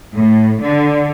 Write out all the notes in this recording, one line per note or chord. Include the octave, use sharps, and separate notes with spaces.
A2
D3